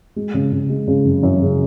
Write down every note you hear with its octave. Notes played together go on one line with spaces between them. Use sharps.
G#3
C#3
C#3
G#3
C#3
F#2
F#2
C#3